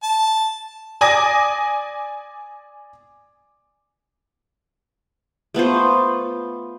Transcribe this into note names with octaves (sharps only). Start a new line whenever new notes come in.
A5
D5 G#5 D6 D#6 A#6
A3 B3 F4 C5